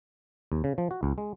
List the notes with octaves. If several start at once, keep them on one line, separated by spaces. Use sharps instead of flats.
D#2
C#3
F3
F#4
C#2
G#3